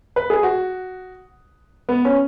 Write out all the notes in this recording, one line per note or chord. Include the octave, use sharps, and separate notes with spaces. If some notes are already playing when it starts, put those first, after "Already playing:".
B4
G#4
F#4
B3
C#4